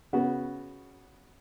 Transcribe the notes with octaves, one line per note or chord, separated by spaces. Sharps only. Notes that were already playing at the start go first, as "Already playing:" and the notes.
C#3 B3 F#4